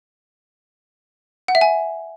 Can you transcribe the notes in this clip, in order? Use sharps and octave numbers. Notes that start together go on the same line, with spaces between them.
F#5
E5
G#5